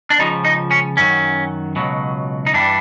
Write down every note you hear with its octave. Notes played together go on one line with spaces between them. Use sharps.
D4
C#2 C#3 F3 D#4
D#4
C#4
F#2 D#3 F#3 C#4
C#2 B2 F#3
D#4
G2 E3 G3 D4